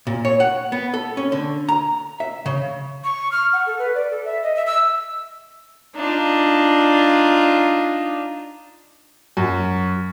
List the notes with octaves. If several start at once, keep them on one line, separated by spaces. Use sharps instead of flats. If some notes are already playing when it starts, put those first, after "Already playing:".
A#2
C#5
F#5
B3
A4
C#4
D3
A#5
E5
C#3
C#6
F6
F#5
A4
B4
D5
A4
E5
D#5
E5
E6
D4 D#4 F4
F#2